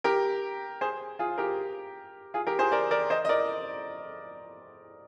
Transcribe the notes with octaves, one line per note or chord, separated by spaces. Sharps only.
G4 A#4
G#4 C5
F4 G#4
G4 A#4
F4 G#4
G4 A#4
G#4 C5
A#4 D5
A#4 D5
C5 D#5
D#5
A#4 D5